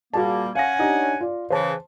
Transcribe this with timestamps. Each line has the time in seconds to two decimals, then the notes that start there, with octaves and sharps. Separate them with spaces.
0.14 A#2 G3 A#3 F#4 G#4 A5
0.55 C#4 F5 F#5 G#5 A#6
0.79 D4 D#4 G4
1.21 F4 D5
1.50 C#3 E3 C5 A5